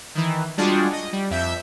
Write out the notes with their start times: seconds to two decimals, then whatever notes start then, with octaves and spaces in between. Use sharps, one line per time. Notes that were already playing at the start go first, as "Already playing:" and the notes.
0.15 D#3 E3
0.57 G3 G#3 D4 F4 F#4 G#4
0.93 D#5
1.13 G3
1.30 F2 E5 G6